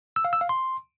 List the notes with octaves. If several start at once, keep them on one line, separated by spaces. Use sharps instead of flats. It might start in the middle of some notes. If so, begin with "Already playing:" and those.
E6
F5
E6
F5
C6